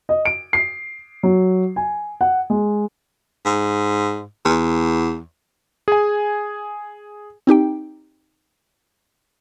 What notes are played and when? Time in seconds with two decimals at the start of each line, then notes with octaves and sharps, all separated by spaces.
0.09 D#5
0.25 D7
0.53 C7
1.23 F#3
1.76 G#5
2.21 F#5
2.50 G#3
3.46 G#2
4.45 E2
5.88 G#4 G#5
7.47 C4 D#4 G4 G5